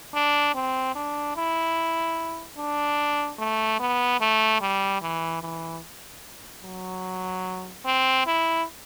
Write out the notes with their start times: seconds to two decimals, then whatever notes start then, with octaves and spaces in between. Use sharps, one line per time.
0.14 D4
0.55 C4
0.95 D4
1.36 E4
2.58 D4
3.39 A3
3.80 B3
4.21 A3
4.61 G3
5.02 E3
5.42 E3
6.64 F#3
7.85 C4
8.26 E4